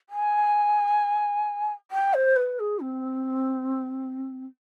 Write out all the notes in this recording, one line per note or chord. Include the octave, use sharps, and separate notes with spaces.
G#5
G5
C5
B4
G#4
C4